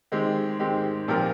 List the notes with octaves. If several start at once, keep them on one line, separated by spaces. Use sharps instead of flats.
D#3 G#3 C4 G4
D#3 G#3 C4 G4
A#2 F3 C4 G4 A#4